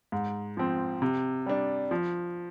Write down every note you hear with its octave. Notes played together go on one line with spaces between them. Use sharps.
G#2
F3 C4
C3
G3 D4
F3